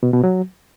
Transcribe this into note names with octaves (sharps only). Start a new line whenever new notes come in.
B2
B2
F#3